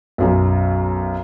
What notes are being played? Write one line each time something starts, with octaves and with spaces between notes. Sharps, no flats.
B1 F#2